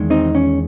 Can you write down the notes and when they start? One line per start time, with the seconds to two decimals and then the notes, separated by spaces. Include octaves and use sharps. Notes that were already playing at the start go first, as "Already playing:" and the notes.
Already playing: E2 D#3 G#3
0.10 C4 D#4
0.35 C#4